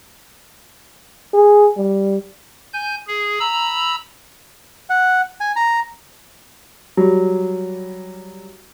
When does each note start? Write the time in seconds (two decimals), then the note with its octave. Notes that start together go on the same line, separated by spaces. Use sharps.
1.33 G#4
1.77 G3
2.73 G#5 G6
3.07 G#4
3.40 A#5 B5 E6
4.90 F#5
5.40 G#5
5.56 A#5
6.97 F#3 G3